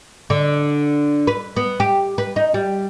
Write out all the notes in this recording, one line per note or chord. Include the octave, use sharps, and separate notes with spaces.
D3
B4
B3
G4
B4
D#4
G3